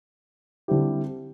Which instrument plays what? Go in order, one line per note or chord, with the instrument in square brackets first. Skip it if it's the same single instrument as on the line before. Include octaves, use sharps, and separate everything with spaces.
[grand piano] D3 G3 C4 E4 G4